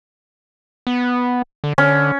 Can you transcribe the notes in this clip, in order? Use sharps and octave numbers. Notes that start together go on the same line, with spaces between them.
B3
D3
D3 C#4